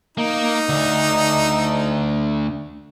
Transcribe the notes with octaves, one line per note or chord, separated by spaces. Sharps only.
A#3 D#4
D2 D3